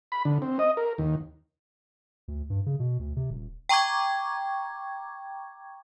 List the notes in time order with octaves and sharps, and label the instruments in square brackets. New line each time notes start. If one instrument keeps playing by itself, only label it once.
[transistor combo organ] B5
D3
C4
D#5
A#4
D#2
[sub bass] D2
G2
C#3
B2
D2
C3
D#1
[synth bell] G5 A#5 C#6 D6 G#6